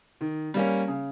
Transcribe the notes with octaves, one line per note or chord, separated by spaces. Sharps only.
D#3
G3 A#3 C#4
C#3